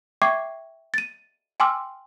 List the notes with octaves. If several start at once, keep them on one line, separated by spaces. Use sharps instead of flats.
E5 G5 C#6 D6 G#6 C7
A6 D#7
G5 G#5 C6 D6 E6 F6